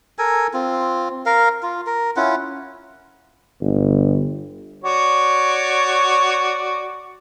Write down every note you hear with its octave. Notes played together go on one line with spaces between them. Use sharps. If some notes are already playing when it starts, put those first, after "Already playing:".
A4 A#4 G#5
C4 F4
A#4 F5
F4
A#4
C#4 E4 F4 F#5
G1
F#4 C#5 D5